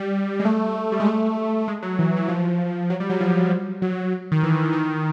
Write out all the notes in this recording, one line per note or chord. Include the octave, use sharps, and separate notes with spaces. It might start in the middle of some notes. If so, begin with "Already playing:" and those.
Already playing: G3
G#3
A3
G3
G#3
A3
G#3
F#3
E3
E3
F3
F#3
G3
F#3
F3
F#3
D#3
E3
D#3